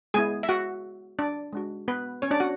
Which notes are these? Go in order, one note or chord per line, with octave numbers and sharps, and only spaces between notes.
G#3 B3 E4 G#4 G#5
E5
F#4 F#5
D4 D5
G#3 D4 F#4
B3 B4
C#4 C#5
D4 D5
F#4 F#5